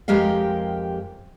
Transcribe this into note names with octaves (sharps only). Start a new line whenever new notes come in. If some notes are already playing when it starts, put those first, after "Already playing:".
F2 G#3 G4 A#4 D#5 F5